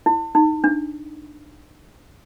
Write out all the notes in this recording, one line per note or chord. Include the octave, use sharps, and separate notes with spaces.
E4
D#4
D4